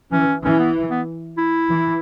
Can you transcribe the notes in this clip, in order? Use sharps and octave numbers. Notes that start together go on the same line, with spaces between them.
E3 C#4
E3 C#4
B3
B3
E4
E3